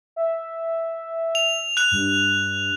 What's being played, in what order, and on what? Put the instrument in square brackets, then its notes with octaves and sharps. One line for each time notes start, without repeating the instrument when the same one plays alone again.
[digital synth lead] E5
[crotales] F7
F#6 F7
[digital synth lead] G2